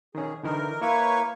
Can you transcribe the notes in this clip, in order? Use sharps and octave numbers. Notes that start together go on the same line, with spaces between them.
D#3 C#4 G#4
D3 E3 D#4 A#4
A#3 E4 B4 C#5 C#6